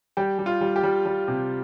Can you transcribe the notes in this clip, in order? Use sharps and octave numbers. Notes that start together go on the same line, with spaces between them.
G3 G4
G3
F4
G3
G4
G3
G3
C3